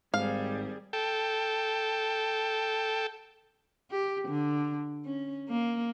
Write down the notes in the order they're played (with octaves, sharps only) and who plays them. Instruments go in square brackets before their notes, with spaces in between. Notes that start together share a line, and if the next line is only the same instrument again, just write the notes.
[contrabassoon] G#1 [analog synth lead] G#2 [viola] G3 G#4 [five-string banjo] F5
[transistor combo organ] A4 G5
[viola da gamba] G4
D3
C#4
A#3